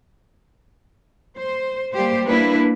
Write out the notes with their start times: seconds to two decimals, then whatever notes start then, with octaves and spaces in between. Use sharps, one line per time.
1.37 C5
1.93 G3 A#3 G4 C5
2.27 A#3 D4 E4 B4